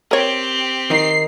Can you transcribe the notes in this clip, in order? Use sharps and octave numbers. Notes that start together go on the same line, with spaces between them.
C4 G4 A#4 C#5
D#3 D#4 C7